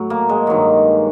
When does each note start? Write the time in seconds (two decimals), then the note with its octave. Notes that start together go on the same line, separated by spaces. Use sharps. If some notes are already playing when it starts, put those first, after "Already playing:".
Already playing: A2 F#3
0.10 A#3
0.29 G#3
0.47 G2 D#3 F#3